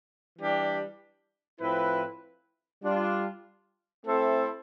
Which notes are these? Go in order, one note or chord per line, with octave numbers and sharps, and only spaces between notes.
E3 G3 D4 G4
A2 F3 C4 E4 B4
G3 D4 F4
A3 C4 E4 A4 C5